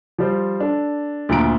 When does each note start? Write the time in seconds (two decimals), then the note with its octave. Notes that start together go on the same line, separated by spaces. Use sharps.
0.18 F3 G3 C5
0.60 D4 A4
1.29 D2 A#2 F3 A#5 D7